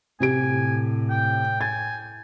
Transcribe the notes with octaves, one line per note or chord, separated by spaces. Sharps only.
A2 C3 G4 G#5 D7
G5
G#5 A6